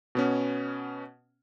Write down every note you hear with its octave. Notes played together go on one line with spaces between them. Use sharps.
B2 B3 C#4